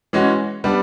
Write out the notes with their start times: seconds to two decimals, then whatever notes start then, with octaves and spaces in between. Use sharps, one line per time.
0.13 E3 G#3 C#4 F#4
0.64 G3 B3 D4